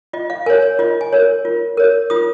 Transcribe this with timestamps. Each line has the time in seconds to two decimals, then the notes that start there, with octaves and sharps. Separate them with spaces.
0.13 F4 D#5
0.30 F5
0.46 A#4 C#5 G#5
0.62 C#5
0.79 F4 D#5
1.01 G#5
1.13 A#4 C#5
1.45 F4
1.77 A#4 C#5
2.10 F4 D#6